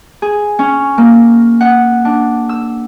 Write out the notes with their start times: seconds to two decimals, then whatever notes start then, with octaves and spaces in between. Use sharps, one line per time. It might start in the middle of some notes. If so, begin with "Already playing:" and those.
0.22 G#4
0.59 C#4
0.98 A#3
1.61 F#5
2.05 D4
2.49 E6